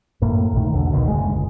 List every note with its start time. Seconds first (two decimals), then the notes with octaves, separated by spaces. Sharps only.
0.22 F#2 A2 A#3
0.52 B1 A2 D#3
0.74 B1 E2 D3
0.93 D#2 B2 D#3
1.05 F#1 D2 G#3
1.32 C#2